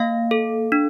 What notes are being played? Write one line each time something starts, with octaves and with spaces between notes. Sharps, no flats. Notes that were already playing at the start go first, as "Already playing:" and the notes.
Already playing: A#3 F5
A4
D4